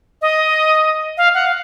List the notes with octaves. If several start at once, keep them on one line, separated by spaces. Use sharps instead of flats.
D#5
F5
F#5
F5